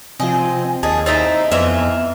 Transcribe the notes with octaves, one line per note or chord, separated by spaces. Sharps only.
C3 F3 C4 F4 D#5 G#5
D#2 G#4 D#5 A5
C4 D#4 E4 E6 A6
F2 E3 B3 F4 E5